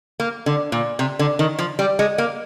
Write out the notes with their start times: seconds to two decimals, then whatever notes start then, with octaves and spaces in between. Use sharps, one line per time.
0.20 A#3
0.46 D3
0.72 A#2
0.99 C3
1.19 D3
1.39 D#3
1.59 F3
1.79 G3
1.99 G#3
2.18 A#3